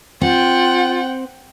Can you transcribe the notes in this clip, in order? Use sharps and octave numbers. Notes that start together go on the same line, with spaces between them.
C4 F4 F#5 G5